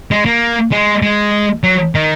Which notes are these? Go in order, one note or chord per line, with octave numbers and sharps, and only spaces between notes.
G#3
A#3
G#3
G#3
F#3
D#3